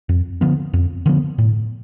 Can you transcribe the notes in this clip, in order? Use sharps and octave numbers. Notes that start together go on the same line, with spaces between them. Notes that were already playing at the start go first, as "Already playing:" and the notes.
F2
D3 F3 B3
F2
D3 F3 B3
A2